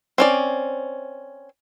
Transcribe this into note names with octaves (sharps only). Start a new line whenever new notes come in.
C4 C#4 D5